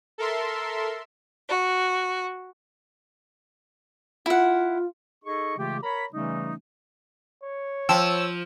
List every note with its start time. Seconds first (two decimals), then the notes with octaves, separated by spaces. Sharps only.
0.18 A4 A#4 E5 C6
1.48 F#4
4.26 E4 F4 F#5
5.24 D#4 G#4 A4 D#5 C#6
5.58 C#3 E3 G#3 A3 F4 G4
5.83 A#4 C#5 A#5 B5
6.13 C#3 E3 G3 A3 C#4 D#4
7.44 C#5
7.89 F3 G5 A5 C6 E6